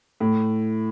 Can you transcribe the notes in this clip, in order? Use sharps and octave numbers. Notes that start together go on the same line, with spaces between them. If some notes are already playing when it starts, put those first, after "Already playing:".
A2